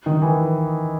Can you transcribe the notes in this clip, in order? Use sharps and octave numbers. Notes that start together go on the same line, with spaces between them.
D#3
E3